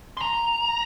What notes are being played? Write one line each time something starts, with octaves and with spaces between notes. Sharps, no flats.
A#5 C6